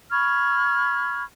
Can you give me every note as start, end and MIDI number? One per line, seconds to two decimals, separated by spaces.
0.12 1.23 83
0.12 1.23 85
0.12 1.23 89
0.12 1.23 92